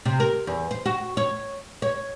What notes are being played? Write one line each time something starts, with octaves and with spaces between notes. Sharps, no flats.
C3
A#4
E2
C5
F#4
C#5
C#5